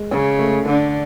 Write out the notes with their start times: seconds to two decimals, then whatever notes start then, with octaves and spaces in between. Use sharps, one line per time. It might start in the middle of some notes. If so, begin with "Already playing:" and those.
Already playing: G#3
0.11 C#3 C#4
0.39 A3
0.65 D3 D4